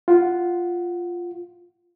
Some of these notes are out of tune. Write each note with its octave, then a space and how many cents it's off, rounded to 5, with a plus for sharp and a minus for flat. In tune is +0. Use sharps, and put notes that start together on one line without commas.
F4 +0 F#5 +0